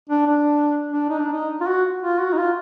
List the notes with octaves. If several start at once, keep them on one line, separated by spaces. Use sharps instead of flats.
D4
D4
D4
D#4
D4
D#4
F4
F#4
F4
F#4
D#4
F4